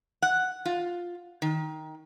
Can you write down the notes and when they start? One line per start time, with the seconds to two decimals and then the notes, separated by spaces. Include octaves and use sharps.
0.22 F#5
0.66 F4
1.42 D#3